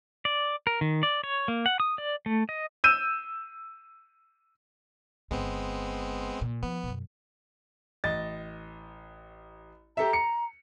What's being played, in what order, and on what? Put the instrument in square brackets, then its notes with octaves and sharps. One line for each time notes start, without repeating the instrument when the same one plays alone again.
[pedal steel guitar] D5
A#4
D#3
D5
C#5
A#3
F#5
D#6
D5
A3
D#5
[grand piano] E6 G6 D#7 E7
[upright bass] G1 D3 [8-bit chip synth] G#3 B3 C4
[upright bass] A#2
[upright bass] F3 [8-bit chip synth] B3
[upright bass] F#2 B2
[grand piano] A1 D#5 A6
[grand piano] G4 A4 E5 [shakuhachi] A#5
[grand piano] C#7